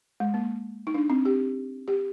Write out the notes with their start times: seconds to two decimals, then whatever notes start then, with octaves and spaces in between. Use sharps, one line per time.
0.20 G#3
0.34 A#3
0.87 D#4
0.94 D4
1.10 C4
1.25 G4
1.88 G4